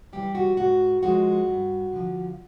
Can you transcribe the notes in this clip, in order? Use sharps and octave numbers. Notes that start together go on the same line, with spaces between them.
E3 G3 G4
F#4
G#2 F#4
F3 G#3 F#4
G2
D3 F3